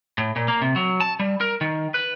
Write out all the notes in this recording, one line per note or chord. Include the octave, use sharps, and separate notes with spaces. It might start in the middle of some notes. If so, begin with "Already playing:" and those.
A2
A#2
A#3
C3
F#3
A5
G3
A#4
D#3
B4